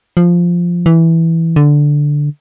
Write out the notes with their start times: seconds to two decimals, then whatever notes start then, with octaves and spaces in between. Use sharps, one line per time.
0.17 F3
0.86 E3
1.56 D3